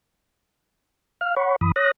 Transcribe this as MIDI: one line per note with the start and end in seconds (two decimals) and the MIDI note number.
1.21 1.35 77
1.21 1.35 89
1.36 1.56 73
1.36 1.56 78
1.36 1.56 83
1.36 1.56 85
1.61 1.72 42
1.61 1.72 52
1.61 1.72 83
1.61 1.72 87
1.76 1.91 73
1.76 1.91 87
1.76 1.91 90
1.76 1.91 94